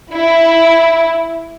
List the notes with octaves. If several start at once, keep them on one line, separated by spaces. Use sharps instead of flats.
E4